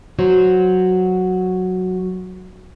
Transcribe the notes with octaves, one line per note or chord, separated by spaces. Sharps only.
F#3 F#4 C5